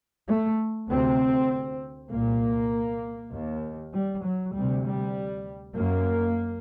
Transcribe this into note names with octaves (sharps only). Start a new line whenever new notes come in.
A3
D2 C3 C4
C2 A#2 A#3
D#2
G3
F#3
D2 C3 G3
G3
F#2 A#3